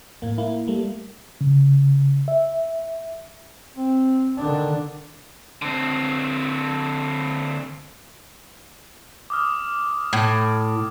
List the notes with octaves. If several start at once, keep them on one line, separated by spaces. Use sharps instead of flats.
A2 A#3
A#3 E4
G3 A3 A#3
C#3
E5
C4
D3 D#3 D4
D3 C4
D6 D#6 F6
A2